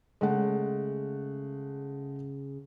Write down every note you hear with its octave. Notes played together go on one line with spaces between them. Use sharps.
C#3 G#3 A3 F#5